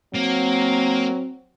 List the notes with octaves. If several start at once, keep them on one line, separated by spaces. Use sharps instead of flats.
F#3 A#3 C4